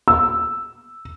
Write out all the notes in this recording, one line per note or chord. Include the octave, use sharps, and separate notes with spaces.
E6